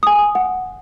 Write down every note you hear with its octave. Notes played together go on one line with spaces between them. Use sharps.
G#5 D#6
F#5